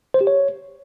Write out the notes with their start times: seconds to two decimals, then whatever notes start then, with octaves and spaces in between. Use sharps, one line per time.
0.14 C5
0.21 G4
0.27 C#5